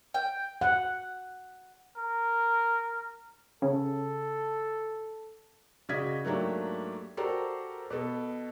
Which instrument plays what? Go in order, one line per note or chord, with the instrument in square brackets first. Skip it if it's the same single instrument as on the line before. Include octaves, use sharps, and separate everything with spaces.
[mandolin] G5
[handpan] F#5
[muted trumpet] A#4
[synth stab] C#3 [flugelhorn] A4
[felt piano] C#3 F#4 D5 D#5 G#6 B6
G#2 F#3 A3 A#3 D4 G4
F#4 G4 A4 A#4 C5 D5
B2 B3 A4